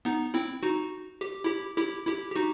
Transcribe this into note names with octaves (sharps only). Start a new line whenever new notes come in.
B3 D#4
C4 E4
D#4 F#4
G4
E4 G4
E4 G4
E4 G4
G4
D#4 F#4